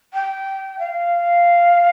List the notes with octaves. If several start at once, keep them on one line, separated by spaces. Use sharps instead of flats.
G5
F5